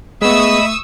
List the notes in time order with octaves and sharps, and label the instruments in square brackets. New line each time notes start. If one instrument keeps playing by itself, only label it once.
[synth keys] G#3 B3 [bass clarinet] A3 [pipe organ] D#5 B5 [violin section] C#6 D#6 E6